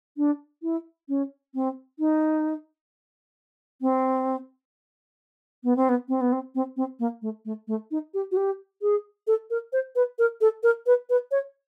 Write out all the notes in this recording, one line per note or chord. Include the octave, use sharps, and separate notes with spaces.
D4
E4
C#4
C4
D#4
C4
B3
C4
B3
C4
B3
C4
C4
C4
A#3
A3
A3
A3
D#4
G4
F#4
G4
G#4
A4
A#4
C5
B4
A#4
A4
A#4
B4
B4
C#5